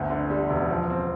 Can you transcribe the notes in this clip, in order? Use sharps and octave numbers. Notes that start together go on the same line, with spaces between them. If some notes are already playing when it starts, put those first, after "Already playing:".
Already playing: G1 D2
D3
G3
E1
F3
C4